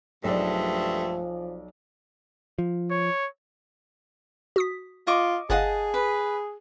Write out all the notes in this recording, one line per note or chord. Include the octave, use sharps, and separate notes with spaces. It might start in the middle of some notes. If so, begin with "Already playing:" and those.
B1 G2 F3 G#3 A3 D5
F3
C#5
F#4 D#6 B6
F4 D#5 C#6 D6
G1 G#4 D#5 F5 F#5 A5
B4